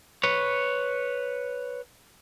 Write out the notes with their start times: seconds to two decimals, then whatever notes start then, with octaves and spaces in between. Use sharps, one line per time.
0.23 B4 C#5